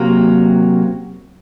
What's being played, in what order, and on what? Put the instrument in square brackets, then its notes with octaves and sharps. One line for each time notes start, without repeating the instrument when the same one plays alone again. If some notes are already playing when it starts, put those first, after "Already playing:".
Already playing: [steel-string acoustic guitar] C3 F#3 A#3